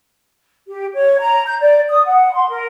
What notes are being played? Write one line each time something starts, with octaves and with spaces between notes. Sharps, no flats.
G4
C#5
A#5
G6
D5
D#6
F#5
C6
A#4